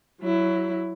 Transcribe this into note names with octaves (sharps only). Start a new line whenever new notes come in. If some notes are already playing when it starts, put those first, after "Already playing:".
F#3 E4